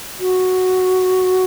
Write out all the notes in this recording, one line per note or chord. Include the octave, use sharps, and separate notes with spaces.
F#4